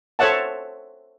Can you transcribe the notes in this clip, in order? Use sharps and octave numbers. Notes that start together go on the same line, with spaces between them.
A4 C5 C#5 E5 F#5 A5